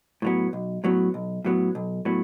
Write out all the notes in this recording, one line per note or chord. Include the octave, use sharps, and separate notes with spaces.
A2 F#3 B3
B1
A2 F#3 B3
B1
A2 F#3 B3
B1
A2 F#3 B3